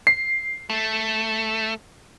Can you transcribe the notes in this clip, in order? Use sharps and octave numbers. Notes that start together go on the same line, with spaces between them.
C7
A3